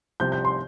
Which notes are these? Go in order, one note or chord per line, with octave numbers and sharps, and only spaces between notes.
C2 C3 F3 C4 G6
G6
C6